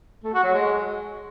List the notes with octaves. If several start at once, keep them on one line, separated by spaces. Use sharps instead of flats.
A3
F#4
F#3
G#3